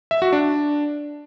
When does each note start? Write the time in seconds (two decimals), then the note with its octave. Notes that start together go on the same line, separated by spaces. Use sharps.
0.11 E5
0.22 F#4
0.33 D4